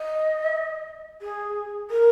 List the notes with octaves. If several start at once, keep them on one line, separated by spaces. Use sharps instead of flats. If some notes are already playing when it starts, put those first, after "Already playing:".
Already playing: D#5
G#4
A#4